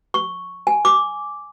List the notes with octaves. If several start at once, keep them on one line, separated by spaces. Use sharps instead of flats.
C#6
G#5
D6